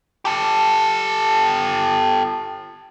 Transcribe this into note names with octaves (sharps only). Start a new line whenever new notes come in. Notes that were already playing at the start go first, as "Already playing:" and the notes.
G4 A4